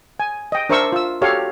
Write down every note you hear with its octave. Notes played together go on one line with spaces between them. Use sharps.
G#5
D#5 G5
D4 A#4 C5 E5 C#6 E6
F4 E6
F#4 G4 A4 C#5 F5